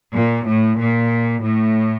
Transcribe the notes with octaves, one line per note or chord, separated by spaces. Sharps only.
A#2
A2
A#2
A2